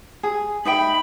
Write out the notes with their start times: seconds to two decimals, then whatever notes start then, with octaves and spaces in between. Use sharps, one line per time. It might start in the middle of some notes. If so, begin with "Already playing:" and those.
0.23 G#4
0.65 D#4 E5 G5 B5